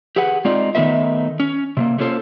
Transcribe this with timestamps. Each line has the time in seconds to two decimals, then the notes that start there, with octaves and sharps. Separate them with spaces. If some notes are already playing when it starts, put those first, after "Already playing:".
0.16 G4 G#4 B4 F#5
0.45 G#3 C4 D#4 F4 D5
0.75 D#3 A3 B3 D#4 B4 E5
1.40 C#4
1.77 C3 A3 A#3
1.98 A3 A#3 C#4 F4 A4 C5